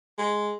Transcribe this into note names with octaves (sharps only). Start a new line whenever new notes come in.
G#3